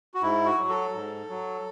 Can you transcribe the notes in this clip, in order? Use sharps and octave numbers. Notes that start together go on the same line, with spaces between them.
F#4
G#2 E4
F#4
F#3
A4
G#2
F#3